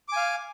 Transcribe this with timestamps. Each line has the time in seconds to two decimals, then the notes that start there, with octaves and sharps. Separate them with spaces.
0.09 D6
0.13 G#5
0.17 F5